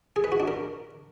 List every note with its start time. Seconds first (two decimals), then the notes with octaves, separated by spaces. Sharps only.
0.16 G#4
0.24 B4
0.32 F#4
0.40 D4
0.48 A#4